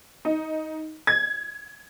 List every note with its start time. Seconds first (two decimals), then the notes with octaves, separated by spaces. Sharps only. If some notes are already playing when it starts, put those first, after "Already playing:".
0.25 D#4
1.07 G#6